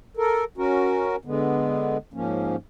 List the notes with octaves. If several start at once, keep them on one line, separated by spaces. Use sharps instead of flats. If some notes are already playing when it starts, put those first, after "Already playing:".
A4 A#4
C#4 F#4 A#4
D3 G#3 B3
G#2 F3 A#3 C#4